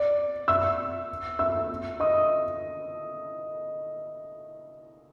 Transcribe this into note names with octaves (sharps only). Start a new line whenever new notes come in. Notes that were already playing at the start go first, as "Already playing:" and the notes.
Already playing: D5
E5 E6
E5 E6
D#5 D#6